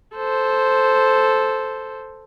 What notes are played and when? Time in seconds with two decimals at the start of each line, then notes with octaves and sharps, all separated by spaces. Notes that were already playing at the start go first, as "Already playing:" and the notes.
0.16 A4 C5